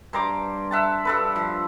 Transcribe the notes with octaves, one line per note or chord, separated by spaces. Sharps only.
G2 C5 A#5 D6
E5 F#5 A5
G2 A4 B4
F3